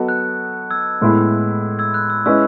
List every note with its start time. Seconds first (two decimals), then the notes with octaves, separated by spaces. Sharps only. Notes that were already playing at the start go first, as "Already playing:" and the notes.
Already playing: F#3 B3 F#4 A4 D#5
0.09 F#6
0.70 E6 G#6
1.01 A2 G#3 B3 E4
1.79 E6 G#6
1.94 F#6
2.10 E6
2.26 G#3 C#4 E4 B4 D#5 E6